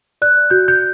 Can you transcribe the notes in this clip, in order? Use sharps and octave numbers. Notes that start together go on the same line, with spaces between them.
D5 F#6
F#4 G6
G6